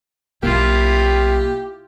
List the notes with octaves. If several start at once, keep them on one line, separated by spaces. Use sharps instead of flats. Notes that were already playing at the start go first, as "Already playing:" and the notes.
B1 A#3 E4 F4 G4